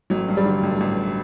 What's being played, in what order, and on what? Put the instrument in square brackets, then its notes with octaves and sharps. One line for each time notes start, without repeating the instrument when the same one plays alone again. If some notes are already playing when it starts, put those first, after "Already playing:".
[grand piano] A1 F#3
G2
G3
D3
A1
A1